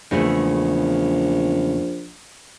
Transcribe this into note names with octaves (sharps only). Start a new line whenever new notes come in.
A#1 E2 C#3 A3